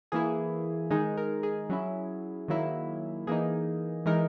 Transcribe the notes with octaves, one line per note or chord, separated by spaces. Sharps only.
E3 A#3 E4 G#4
D#3 G#3 D#4 G#4
A#4
G#4
F#3 C#4 E4
D#3 F#3 A#3 E4
E3 A#3 D#4 G#4
E3 G#3 D#4 A#4